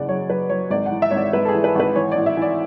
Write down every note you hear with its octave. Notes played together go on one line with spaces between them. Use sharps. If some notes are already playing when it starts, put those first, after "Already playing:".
Already playing: F#1 E2 C#3 D5 F#5
F#3 C#5
F#3 B4
F#3 C#5
G#1 D5
F#5
E3
E5
G#1 C#5
D5
G#1 B4
A4
G#4
E3
B4
G#1 B4
E3 C#5
A1 D5
E5
E3 D5